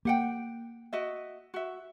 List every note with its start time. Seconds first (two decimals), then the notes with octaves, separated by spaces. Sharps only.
0.05 A#3 G4 F#5 G5
0.93 F#4 D#5 E5
1.54 F#4 E5